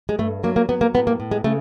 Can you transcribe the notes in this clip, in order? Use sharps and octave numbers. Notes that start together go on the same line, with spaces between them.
G#3
G2 A3
F#3 A#3
A#3
F#3 B3
A#3
A2 B3
A#3
A2
G#3
C#3 A3